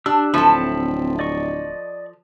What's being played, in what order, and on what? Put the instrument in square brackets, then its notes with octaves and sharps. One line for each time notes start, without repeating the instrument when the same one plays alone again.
[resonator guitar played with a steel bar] D4 [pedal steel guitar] G4 E6
[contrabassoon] D1 [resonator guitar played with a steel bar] F3 A4 [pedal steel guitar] C4 E5 B5
[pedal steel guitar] D5 D#5 C#6